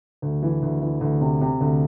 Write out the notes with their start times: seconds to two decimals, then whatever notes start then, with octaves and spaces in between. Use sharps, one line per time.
0.22 D2
0.43 E3
0.62 D2
0.82 E3
1.01 D2
1.21 C3
1.41 C3
1.61 D2